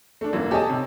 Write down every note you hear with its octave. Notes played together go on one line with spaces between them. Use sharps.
A3 D4
E1 F#2 E3 A#3
G4 A4 C#5 D#5 G#5 A5
C3